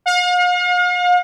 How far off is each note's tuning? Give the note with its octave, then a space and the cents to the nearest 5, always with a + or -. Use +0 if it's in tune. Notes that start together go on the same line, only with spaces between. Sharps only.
F5 +45